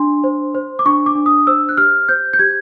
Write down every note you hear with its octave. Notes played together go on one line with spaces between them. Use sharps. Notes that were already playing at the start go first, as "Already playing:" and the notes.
Already playing: D4 C6
C5
C5
D6
D4 C#6
D6
D4
D#6
C5 E6
F#6
G4 F6
C5 G6
G6
G4 G#6